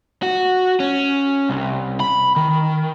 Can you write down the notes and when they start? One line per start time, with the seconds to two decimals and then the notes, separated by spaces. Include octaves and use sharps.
0.23 F#4
0.80 C#4
1.50 C2
2.00 B5
2.36 D#3